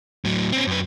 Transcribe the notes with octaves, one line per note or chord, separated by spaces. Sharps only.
A2 F#3
C4 C#4
F#2 B4